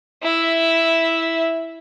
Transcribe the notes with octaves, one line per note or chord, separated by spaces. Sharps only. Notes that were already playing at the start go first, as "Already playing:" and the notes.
E4 E5